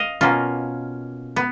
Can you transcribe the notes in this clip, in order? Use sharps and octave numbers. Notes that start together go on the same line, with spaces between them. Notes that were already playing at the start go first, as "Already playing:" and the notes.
Already playing: D#5 F5
B2 A#3 C#4 F4
B3